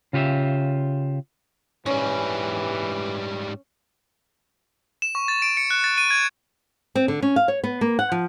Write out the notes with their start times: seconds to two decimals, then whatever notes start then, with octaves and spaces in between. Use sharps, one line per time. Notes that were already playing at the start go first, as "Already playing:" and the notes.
0.13 C#3 F4 G4 C#5 E5
1.86 G#2 E3 G3 C#4
5.02 E7
5.15 C#6
5.28 A6
5.42 D7
5.57 C#7
5.71 F#6
5.84 A6
5.98 D#7
6.11 G#6
6.95 C4
7.08 D3
7.22 C#4
7.36 F5
7.48 C#5
7.64 B3
7.81 A#3
7.99 F#5
8.12 F3